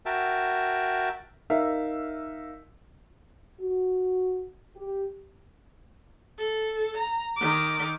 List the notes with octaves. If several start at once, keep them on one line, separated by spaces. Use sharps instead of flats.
F#4 A#4 E5 G5 A5
D#4 A#4 E5 F5 E6
F#4
G4
A4
A#5
D#3 D6